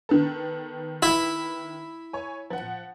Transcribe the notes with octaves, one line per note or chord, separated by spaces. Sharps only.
D#3 B3 A4
E4
C#5 G#5
F3 F#5